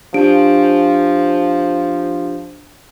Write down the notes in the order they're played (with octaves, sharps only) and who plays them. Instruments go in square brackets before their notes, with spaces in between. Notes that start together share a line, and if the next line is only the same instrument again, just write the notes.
[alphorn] F3 [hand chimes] D4 G4 D7